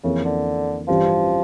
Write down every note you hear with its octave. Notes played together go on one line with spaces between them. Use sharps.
F2 C#3 E3 A#3 C#4 E4
D3
A1 G2 E3 F3 G3 C#4